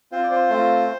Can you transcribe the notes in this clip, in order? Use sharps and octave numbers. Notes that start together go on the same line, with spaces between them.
C4 F4 C5
D5
C5
A3 C4 F4